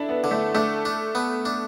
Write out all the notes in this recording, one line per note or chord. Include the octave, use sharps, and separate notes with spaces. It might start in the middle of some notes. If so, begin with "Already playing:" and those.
Already playing: D4 E4 A4
B3
D3
A3
A3 D4
D4
B3
D4